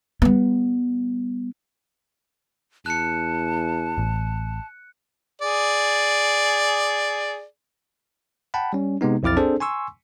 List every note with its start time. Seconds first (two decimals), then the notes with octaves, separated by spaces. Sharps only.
0.22 G3 B3
2.86 E2 A5 F#6 C#7
3.98 A1
5.41 G#4 D5
8.54 F#5 G5 A5 B5
8.73 G3 C#4
9.01 C3 G#3 B3 D#4
9.23 B1 F2 E4 D6 F6 A6
9.37 C4 D4 G#4 A4 C5
9.60 G#5 C6 C#6 E6